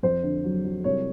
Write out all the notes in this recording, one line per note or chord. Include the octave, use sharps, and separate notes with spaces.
F2 C5
D3
F#3
F#3
C2 C#5